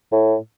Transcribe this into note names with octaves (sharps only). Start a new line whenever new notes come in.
A2